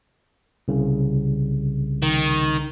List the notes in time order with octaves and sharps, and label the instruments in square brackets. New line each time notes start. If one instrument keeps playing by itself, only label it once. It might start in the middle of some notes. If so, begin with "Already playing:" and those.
[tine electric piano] C2 C#3
[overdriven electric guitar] D#3